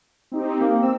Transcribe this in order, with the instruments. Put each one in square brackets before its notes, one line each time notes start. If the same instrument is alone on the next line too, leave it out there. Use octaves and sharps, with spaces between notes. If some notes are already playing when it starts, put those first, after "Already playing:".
[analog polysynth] C4 D#4 G4
[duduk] A#3
[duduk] C4 [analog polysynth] E6